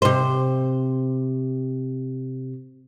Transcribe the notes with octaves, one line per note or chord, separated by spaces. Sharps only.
C3 C5